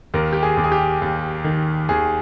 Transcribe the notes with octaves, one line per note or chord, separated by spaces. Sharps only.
D#2 A#4
G4
G#4
D#2
G#4
G4
D#2
D#3
D#2 G#4